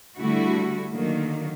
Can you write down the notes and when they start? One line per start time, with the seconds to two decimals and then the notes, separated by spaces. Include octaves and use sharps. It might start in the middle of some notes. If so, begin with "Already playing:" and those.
0.18 D3 G3 A3 E4 F#4
0.91 D3 D#3 F#3 A#3